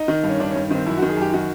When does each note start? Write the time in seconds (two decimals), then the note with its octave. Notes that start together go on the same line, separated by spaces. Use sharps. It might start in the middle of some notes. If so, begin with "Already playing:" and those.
Already playing: D#4
0.08 D#3
0.24 G2
0.29 C#4
0.40 D#3 D4
0.51 C#4
0.55 G2
0.71 D#3 C4
0.86 F#2 E4
0.97 F#4
1.02 D#3
1.09 G#4
1.17 F#2 G4
1.33 D#3 F#4